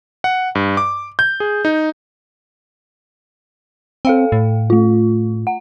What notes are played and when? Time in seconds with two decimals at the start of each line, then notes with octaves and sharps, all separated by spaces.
0.24 F#5
0.55 G2
0.77 D6
1.19 G6
1.40 G#4
1.65 D#4
4.05 C4 A4 F5 G5
4.32 A2
4.70 A3 F4
5.47 F#5